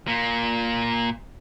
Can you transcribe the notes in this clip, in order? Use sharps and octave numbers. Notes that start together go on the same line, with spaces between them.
A#2 A#3